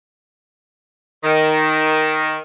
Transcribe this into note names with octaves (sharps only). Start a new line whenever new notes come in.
D#3